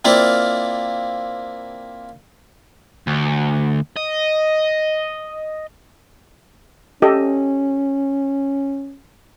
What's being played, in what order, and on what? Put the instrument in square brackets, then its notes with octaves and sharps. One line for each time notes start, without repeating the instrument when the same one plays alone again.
[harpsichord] A#3 C4 E4 F4 D5 F5
[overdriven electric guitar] D2
D#5
[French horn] C#4 [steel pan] G4 A4 D#5